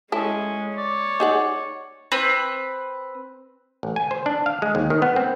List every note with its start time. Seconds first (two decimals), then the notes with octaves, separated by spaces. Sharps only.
0.12 G#3 C#4 E4 A4
0.77 C#5 D5
1.20 D#4 G#4 F#5
2.12 C4 B4
3.83 A1
3.96 G#5
4.11 C5
4.26 D4
4.46 F5
4.62 G#3
4.75 D#2
4.90 D#3
5.02 B3
5.16 C4